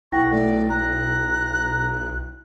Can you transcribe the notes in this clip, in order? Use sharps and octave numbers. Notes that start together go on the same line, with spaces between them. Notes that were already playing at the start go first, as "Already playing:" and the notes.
B1 E4 F#5 G5 C#6 A#6
B1 A3 D5
A#5 F#6